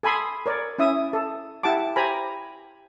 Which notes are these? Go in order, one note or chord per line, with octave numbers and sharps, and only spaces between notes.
A4 G#5 B5 C6 D#6
A#4 C#5 D5
C#4 E4 E5 D#6
A4
E4 G4 F#5 A5 D6
G4 C5 G#5 A#5 B5